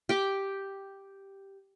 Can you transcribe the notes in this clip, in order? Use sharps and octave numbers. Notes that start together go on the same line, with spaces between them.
G4 G5 D6